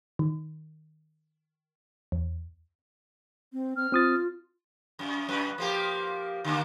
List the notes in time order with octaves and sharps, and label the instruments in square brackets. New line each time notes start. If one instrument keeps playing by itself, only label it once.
[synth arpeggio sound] D#3
E2
[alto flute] C4
[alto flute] C4 [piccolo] F6
[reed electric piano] C4 D#6 A6 [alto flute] F4
[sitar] F#2
F#2 B4
F3 A#3 G4
D3 A#3